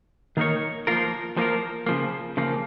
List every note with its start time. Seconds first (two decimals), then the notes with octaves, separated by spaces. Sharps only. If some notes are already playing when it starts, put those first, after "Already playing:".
0.37 D#3 A#3 D#4 A#4 C#5
0.87 F3 A#3 F4 A#4
1.37 F3 A#3 F4 A#4
1.86 C#3 F3 A#3
2.37 C#3 F3 A#3